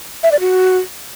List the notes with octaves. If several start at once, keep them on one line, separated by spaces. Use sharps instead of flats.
E5
D5
F#4